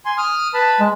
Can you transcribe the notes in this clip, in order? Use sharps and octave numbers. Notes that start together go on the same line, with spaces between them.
G#5 C6
D#6 F6
B4 A5 B5
G#3